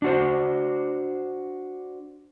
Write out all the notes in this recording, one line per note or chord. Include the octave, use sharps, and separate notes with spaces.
D4 F#4 C5